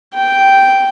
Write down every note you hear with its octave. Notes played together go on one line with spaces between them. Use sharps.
G5